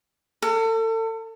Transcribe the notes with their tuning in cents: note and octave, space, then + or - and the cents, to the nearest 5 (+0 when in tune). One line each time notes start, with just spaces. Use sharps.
A4 +35